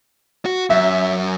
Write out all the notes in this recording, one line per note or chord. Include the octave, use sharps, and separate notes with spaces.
F#4
F#2 E5